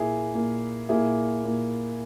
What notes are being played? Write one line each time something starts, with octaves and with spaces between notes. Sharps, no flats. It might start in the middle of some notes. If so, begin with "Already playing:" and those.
Already playing: A#2 A#3 E4 G#4
A#2 A#3
A#2 A#3 E4 G#4
A#2 A#3